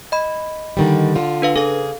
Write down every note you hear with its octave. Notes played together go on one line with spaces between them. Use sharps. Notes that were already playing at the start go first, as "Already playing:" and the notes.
D#5 B5
D3 D#3 G3
D3 F4
D4 B4 F5
C#3 G#4 A4 F5